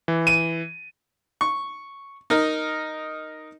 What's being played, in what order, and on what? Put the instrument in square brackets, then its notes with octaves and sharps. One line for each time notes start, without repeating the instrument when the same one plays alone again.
[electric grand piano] E3
[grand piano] D#7
[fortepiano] C#6
D#4 A#4 D#5